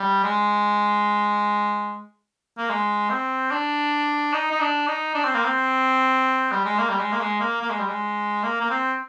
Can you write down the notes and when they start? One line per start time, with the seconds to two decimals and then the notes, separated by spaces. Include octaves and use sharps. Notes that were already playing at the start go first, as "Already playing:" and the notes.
Already playing: G3
0.24 G#3
2.58 A#3
2.70 G#3
3.10 C4
3.51 D4
4.33 D#4
4.51 D#4
4.60 D4
4.88 D#4
5.14 D4
5.24 C4
5.34 A#3
5.44 C4
6.52 G3
6.65 G#3
6.78 A#3
6.89 G3
6.99 G#3
7.12 A#3
7.20 G#3
7.40 A#3
7.61 A#3
7.70 G#3
7.79 G3
7.88 G#3
8.43 A#3
8.61 A#3
8.70 C4